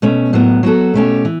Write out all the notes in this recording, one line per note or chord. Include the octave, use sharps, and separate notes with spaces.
B2 A3 C#4
A2 F#3 B3
F#3 B3 F#4 A4
B2 A3 C#4 G4
E3